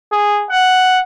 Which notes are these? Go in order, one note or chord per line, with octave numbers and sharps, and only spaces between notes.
G#4
F#5